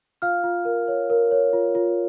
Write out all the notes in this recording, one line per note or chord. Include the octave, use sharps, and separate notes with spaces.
F4 F5 F6
F4
A#4
C#5
A#4
C#5
F4
F4